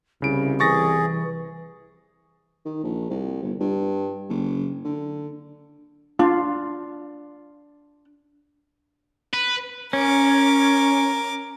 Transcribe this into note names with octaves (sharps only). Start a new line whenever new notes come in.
C2 C#3 E4 D7
E3 G#4 C#6 A6 A#6
D#3
A#1
C2
G1
G2
F#1
D3
D4 F4
B4
C#4 A#4 D6